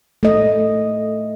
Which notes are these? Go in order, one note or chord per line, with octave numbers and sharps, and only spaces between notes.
A3 D#5